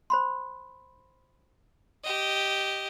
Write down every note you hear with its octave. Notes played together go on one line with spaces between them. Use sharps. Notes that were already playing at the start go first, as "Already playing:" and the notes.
C5 B5 C6
G4 D#5